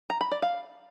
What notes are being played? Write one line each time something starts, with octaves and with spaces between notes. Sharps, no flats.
A#5
B5
D5
F5